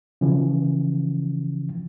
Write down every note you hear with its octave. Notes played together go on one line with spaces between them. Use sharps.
C#3 E3 F3